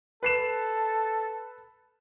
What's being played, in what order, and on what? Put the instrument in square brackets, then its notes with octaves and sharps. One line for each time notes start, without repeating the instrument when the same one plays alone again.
[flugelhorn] A4 [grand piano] B4 C7 E7